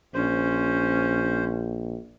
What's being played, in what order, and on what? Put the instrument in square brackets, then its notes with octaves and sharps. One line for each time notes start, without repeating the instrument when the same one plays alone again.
[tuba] A#1 [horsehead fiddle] C#4 [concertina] C5